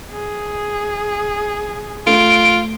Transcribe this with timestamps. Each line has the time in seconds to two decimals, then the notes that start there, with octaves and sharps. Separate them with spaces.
0.11 G#4
2.07 A3 F4 D7